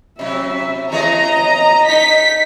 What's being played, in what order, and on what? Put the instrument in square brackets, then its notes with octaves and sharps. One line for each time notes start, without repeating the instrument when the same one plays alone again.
[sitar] C3 F#3 [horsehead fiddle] E5
[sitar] E3 G#4 C#5 [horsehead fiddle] D#5 [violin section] A#5
[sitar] D#4 [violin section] B6